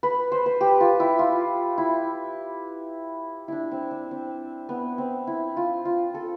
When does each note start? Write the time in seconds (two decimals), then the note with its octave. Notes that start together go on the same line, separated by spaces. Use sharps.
0.03 B4
0.32 C5
0.46 B4
0.61 G4
0.80 F4
1.00 E4
1.19 F4
1.78 E4
3.48 D4 E4
3.71 C4
3.91 D4
4.11 C4
4.69 B3
4.98 C4
5.27 E4
5.57 F4
5.85 F4
6.14 A4